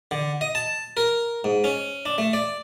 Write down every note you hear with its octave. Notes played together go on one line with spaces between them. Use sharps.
D3
D#5
A5
A#4
G#2
C#4
D4
A3
D5